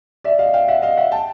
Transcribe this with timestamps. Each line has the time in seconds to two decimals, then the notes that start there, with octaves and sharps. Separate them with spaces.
0.24 D5 E5
0.39 D#5 F5
0.54 F5 G5
0.68 E5 F#5
0.82 D#5 F5
0.97 E5 F#5
1.12 G5 A5